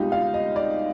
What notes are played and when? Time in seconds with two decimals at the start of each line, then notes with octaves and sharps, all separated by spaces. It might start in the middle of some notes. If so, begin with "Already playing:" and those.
Already playing: C2 B2 G#3 D#4 F4 G4
0.12 F5
0.34 D#5
0.56 D5